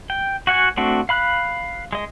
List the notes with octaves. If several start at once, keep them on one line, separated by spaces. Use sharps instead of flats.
G5
F#4 F#5 G#5
A3 C4 D4 F#4
F5 B5 F#6
G#3 D#5